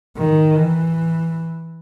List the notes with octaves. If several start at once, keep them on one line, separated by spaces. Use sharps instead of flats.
D#3
E3